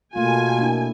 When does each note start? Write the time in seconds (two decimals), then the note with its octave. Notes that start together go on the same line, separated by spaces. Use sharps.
0.16 B2 A3 A#3 F4 G#5
0.58 A#3 D4 E4